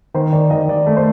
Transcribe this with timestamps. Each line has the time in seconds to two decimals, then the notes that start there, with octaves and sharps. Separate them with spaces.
0.14 D#3 C5
0.33 D#3 D5
0.50 D#3 D#5
0.69 D#3 D5
0.87 A3
0.97 C5